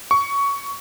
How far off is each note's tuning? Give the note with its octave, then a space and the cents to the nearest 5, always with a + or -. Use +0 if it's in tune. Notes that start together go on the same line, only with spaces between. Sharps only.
C#6 +15